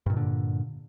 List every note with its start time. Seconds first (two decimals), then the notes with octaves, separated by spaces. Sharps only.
0.06 G2
0.10 A#2
0.13 D#3
0.17 D3